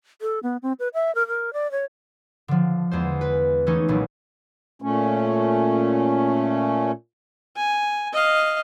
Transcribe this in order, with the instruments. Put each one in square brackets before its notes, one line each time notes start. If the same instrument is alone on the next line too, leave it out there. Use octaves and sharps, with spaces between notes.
[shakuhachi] A4
B3
C4
B4
E5
A#4
A#4
D5
C#5
[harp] D3 F3
E2 G#3 C5
B4
E3 A3 C#4 D#4 G#4
D#1 B1
[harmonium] A#2 A3 C#4
[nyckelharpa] G#5
D#5 F5